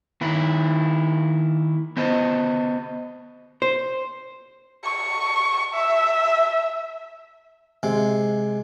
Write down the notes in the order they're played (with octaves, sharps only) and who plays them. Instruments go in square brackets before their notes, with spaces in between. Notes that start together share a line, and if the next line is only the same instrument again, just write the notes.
[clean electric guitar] D#3 A#3 E4
B3 C5 D#5
[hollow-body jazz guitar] C5
[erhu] C#6
E5
[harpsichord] C3 G#3